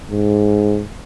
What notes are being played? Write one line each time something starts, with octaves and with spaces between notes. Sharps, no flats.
G#2